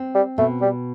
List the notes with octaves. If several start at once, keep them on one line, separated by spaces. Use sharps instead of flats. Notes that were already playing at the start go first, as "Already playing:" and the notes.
Already playing: C4
G3
B2 A3
G3